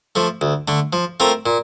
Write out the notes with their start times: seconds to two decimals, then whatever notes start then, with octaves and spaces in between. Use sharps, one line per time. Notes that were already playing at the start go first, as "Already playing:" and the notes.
0.16 F3 A3
0.41 D2
0.68 D3 A3
0.93 F3
1.20 A3 C4 F4 A#4
1.46 A#2